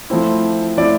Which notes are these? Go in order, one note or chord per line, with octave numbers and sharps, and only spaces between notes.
F3 A3 C4 E4
F3 A3 C4 E4 D5